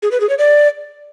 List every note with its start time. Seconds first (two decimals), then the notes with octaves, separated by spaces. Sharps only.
0.03 G#4
0.11 B4
0.20 G#4
0.29 C#5
0.38 D5